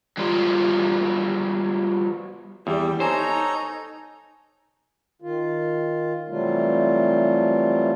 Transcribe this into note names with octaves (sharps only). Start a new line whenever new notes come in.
F#3 G3 B3 F4 G4
E2 G3 G4
D#4 A4 C5 C#5 G#5 A#5
D#3 F4
C3 E3 F#3 G3 A3 F4